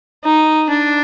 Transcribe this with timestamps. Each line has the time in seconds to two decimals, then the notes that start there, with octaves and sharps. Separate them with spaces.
0.24 D#4
0.70 D4